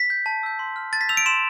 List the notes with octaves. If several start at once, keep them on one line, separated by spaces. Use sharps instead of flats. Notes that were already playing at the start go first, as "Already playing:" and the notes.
Already playing: B6
G6
A5
E6 G6
C6
F6
A5 A6
B6
E6 G6 F7
D7
C6 E7